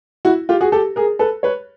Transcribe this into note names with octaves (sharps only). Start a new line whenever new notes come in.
E4 F#4
F4 G4
F#4 G#4
G4 A4
G#4 A#4
A4 B4
B4 C#5